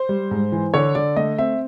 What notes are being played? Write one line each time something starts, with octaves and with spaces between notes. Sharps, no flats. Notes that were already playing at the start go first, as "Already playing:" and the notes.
Already playing: C5
G3
G#2
E3
D3 C#5
D3 D5
A3 D#5
C4 E5